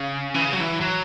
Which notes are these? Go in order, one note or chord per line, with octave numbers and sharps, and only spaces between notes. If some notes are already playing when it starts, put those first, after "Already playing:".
Already playing: C#3
E3
C#3
F#3
E3
F#3